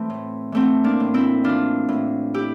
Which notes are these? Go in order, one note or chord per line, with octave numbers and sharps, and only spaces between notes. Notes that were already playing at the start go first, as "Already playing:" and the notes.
Already playing: E3 A3 C4
A2
E3 A3 C4
A#3 D4
A2
C4 E4
E3 D4 F4
A2
E4 G4